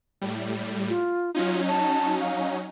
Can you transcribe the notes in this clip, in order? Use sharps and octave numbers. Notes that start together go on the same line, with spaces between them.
A2 G3
F4
F#3 C#4 D#4 F4
A5
F5